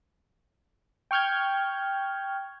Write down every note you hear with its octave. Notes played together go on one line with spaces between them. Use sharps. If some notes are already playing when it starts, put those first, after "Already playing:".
G5 C#6 F6 G6 G#6